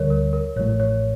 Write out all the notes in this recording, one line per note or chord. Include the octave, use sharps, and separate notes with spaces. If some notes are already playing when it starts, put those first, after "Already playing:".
Already playing: D2 D3 G3 A#4 C#5
A#4
A#4
A1 A2 F3 A3 C#5
C#5